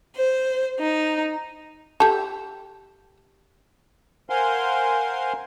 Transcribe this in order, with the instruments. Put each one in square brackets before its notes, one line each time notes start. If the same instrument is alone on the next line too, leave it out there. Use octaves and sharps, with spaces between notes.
[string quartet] C5
D#4
[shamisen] G4 A4
[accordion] A#4 C5 F5 F#5 G#5 C6